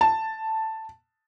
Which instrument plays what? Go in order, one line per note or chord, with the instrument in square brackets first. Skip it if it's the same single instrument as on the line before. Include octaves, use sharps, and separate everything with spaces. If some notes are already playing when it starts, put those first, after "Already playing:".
[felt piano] A5